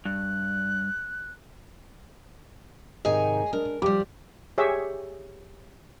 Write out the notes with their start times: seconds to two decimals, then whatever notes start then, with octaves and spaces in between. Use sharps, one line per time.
0.05 G2 F#6
3.05 G#2 C3 D#3 G#4 C#5 D#5 G#5
3.53 G#3 D4 A#4
3.82 F3 G3 G4 D6
4.58 G4 G#4 C#5 E5